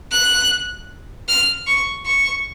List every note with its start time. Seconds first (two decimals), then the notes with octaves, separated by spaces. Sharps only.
0.12 F#6
1.28 F6
1.67 C#6
2.06 C#6